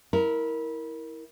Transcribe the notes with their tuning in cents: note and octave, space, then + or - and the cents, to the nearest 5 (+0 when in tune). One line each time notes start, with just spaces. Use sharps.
E4 -20 A#4 +0